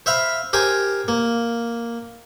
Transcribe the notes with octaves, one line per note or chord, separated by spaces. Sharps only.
C5 E5 F5 B5
G4 A#4 C5 G#5
A#3